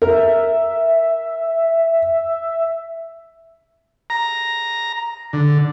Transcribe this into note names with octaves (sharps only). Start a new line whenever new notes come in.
A#4 E5
A#5
D3